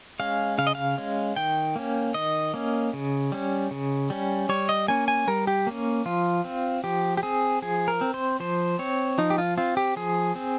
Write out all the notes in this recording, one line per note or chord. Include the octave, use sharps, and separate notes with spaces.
G#3 C#4 F5
C#3 F5
D#5
F5
G#3 C#4
D#3 G5
A#3 C#4
D#3 D#5
A#3 C#4
C#3
G3 C#4
C#3
G3 C#4
G3 C#5
D#5
A#3 C#4 G#5
G#5
G3 A#4
G4
A#3 C#4
F3 F4
C4
F3 G4
G4
C4 G#4
F3 G#4
A#4
C4
C5
F3 C5
C4 C#5
F3 D#4
G4
F4
C4 F4
G4
F3 G#4
C4